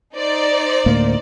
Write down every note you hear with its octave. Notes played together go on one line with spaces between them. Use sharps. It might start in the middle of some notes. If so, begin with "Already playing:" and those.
D#4 C5 D5
D2 A2 A#3